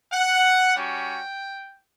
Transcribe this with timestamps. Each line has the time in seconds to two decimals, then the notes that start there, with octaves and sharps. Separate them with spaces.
0.12 F#5
0.75 G3 C#4 F#4 G5